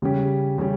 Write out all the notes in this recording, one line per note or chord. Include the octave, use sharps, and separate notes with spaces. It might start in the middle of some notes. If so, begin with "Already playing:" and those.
C#3 G3 C#4 G4
C#3 G3 C#4 G4